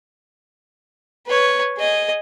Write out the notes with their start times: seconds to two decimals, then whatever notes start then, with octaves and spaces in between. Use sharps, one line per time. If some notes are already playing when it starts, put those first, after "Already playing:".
1.27 B4 C#5
1.78 G#4 D#5